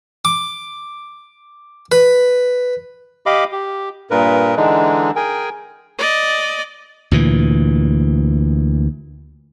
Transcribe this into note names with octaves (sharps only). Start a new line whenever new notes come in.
D6
B4
G4 D#5 F5 B5 D6
G4
G2 A#2 A#4 B4
D3 E3 G#3 D4 D#4
G#4 A#4 G5 G#5
D5 D#5
D2 A#2 E3